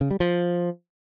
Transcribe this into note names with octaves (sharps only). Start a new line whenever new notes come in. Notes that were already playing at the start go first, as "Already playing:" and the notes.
C#3
G3
F3